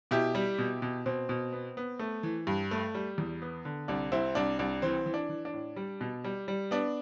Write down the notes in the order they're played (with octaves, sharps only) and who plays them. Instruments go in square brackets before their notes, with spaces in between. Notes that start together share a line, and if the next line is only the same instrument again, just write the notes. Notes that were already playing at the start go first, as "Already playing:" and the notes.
[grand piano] B2 E4 G4
G3
B2
B2
B2 C4
B2
B3
B3
A3
E3
G2
A3
G3
E2
B3
D3
C2 D4
C2 C4 E4
C2 D4
C2 D4
E3 C4
E3
D4
E3
D4
A2
G3
B2
G3
G3
B3 D4